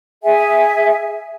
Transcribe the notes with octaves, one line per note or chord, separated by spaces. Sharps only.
G#4 E5 G#5